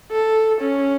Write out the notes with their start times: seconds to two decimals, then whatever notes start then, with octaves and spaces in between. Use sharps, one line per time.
0.11 A4
0.61 C#4